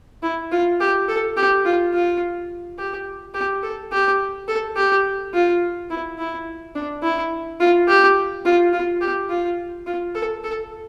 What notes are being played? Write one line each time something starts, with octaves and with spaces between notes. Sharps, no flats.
E4
F4
G4
A4
G4
F4
F4
G4
G4
A4
G4
A4
G4
F4
E4
E4
D4
E4
F4
G4
F4
F4
G4
F4
F4
A4
A4